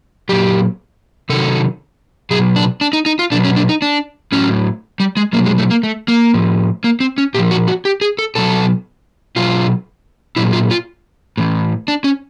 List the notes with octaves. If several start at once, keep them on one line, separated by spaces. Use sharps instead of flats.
A#2 F#3 G4
C3 D#3 F#3 A4
B2 F#3 G#4
D4
D4
D#4
D#4
F4
B2 F#3 D4
C#4
D4
D#4
D4
A2 F#3 C#4
G3
G#3
B2 F#3 A#3
G#3
A3
A#3
A3
A#3
A2 F3
A#3
C4
C#4
A#2 F3 G4
F#4
F#4
G4
G#4
A4
B2 F#3 A4
B2 F#3 F4
A#2 F#3 E4
F4
F4
A2 E3
D4
C#4